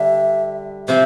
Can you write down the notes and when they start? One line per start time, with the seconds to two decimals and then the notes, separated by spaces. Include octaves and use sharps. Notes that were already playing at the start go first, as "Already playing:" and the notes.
Already playing: D3 G3 D4 E5
0.88 C3 F3 C4 E5